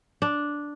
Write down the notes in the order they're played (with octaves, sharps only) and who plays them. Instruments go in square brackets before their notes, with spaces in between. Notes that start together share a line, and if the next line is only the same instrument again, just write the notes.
[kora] D4